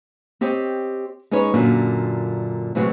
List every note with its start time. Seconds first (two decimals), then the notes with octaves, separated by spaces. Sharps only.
0.41 C4 G4 C#5 D#5 G5
1.31 G#3 C#4 D#4 B4 C#5
1.54 F#2 A#2 D3
2.75 A2 C3 E3 F#3 G#3 F#4